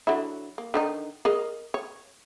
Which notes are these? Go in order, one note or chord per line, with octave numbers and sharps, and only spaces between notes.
D3 F#3 E4
A#3
D3 D#3 D#4
G#4 A#4 D#5
C#5